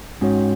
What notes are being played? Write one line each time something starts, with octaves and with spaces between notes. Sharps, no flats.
G#2 C#4 F#4 C#5